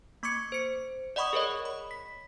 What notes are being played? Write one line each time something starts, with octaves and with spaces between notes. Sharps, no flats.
A#3 C#6 D6 G#6 C#7
C5 C#7
D5 D#5 F#5 B5 C#6 D#6
G#4 A#4 C#5 D#5
B5
B6